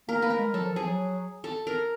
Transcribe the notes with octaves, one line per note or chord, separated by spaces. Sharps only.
A#3 A#4
A#3 B4
A#4
G#3
F#3 A4
F3
F3 G#4
F#3
A4
A#4